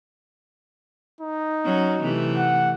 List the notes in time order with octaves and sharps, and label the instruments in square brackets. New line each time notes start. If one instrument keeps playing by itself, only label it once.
[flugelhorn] D#4
[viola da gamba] F#3 C#4
C3 E3 A3
[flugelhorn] F#5